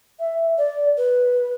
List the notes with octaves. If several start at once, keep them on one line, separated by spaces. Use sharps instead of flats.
E5
D5
B4